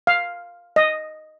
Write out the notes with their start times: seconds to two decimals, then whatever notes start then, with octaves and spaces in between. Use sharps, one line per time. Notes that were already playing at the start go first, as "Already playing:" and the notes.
0.07 F5
0.76 D#5